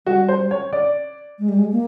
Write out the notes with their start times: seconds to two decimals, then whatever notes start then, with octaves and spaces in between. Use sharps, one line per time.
0.07 G3 F#4
0.28 C5
0.51 C#5
0.73 D5
1.39 G#3
1.49 G3
1.59 G#3
1.72 A#3